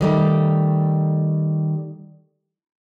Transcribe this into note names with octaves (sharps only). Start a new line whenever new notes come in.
D#3 G3 A3